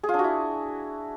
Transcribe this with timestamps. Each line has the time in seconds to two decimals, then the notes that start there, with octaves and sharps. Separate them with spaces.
0.03 G#4
0.09 F4
0.14 D4
0.19 F#4
0.24 E4